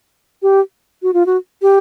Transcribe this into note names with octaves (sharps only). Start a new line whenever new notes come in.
G4
F#4
F4
F#4
G4